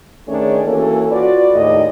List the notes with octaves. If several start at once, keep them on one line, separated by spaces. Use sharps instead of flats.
D#3 A3 C#4 D4 G#4 C#5
E3 A#3 C#4 F#4 A4
F4 F#4 B4 D5
D#2 A2 G#3 D#4 D5 D#5